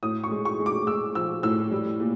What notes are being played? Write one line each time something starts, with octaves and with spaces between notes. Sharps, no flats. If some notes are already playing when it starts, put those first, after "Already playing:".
A2 D#6
C#6
G#3
C#6
G#3
D6
G#3 E6
F3 E6
A2 E6
G3
A#2